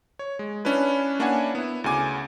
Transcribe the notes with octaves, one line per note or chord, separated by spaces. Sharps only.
C#5
G#3
C#4 D4 E4 B4
A#3 D4 E4 C#5 F#5 G#5
B3 E4
D2 C#3 G#5 D6